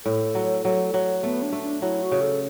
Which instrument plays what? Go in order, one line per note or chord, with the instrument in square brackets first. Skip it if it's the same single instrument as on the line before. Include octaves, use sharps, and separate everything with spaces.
[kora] A2 [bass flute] A4
[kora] F#3
F#3
F#3
[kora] A3 [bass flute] B3
[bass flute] D4
[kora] A3
[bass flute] D4
[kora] F#3 [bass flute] E4
[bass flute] F#4
[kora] C#3
[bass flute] A4